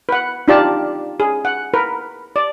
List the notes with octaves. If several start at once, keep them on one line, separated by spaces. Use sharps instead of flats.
B4 F#5
D4 D#4 F4 G4 D5 A5
G#4
F#5
A#4 B4
D5